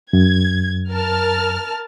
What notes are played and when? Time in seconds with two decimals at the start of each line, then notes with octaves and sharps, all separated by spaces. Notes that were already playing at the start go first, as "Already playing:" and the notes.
0.13 F#2 G#6
0.92 A#4 A5 F6